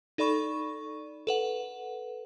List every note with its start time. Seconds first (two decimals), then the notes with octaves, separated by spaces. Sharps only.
0.18 D#4 A4 D5 B5 C#6
1.27 A4 B4 F#5